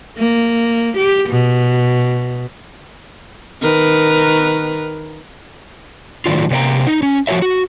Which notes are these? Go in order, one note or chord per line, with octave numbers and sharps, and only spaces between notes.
A#3
G4
B2
D#3 A#4 B4
A2 D#3 F#3 D4 F4
C3 A#3 C#5 G5 A#5
D#4
C#4
F3 F#4 C5 C#5 E5
F#4